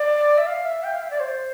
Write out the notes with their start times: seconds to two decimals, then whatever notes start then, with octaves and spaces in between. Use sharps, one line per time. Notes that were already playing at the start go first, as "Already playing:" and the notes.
Already playing: D5
0.37 E5
0.46 F5
0.65 E5
0.83 G5
0.92 F5
1.02 E5
1.10 D5
1.20 C5